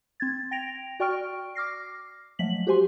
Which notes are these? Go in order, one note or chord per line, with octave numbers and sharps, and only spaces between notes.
C4 G#6 A6
G5 A#6 D7 F7
F#4 D5 G5 C#6 F6 D7
D6 F6 A#6 C7
F3 F#3 G#3 A3 B6 F#7
F#4 G4 C5 G#5 C6